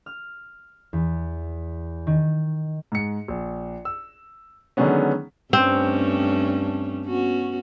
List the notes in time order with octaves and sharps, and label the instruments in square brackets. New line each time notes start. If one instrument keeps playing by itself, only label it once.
[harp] F6
E2
D#3
[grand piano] G#2 C#7
A#1
E6
D3 D#3 F#3 G#3 B3 C#4
[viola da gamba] G2 A3 C#4 [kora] C4
[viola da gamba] B3 C#4 F#4